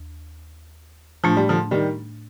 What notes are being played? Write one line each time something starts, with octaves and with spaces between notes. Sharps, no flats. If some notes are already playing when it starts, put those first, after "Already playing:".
Already playing: D#2
A2 F3 A3 D4
G3
D3 F3
D#3 G3